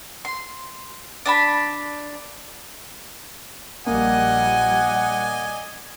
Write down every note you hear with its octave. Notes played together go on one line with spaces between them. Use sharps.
C6
D4 A5 B5
A#1 G3 A#3 D5 D#5 F#5 G#5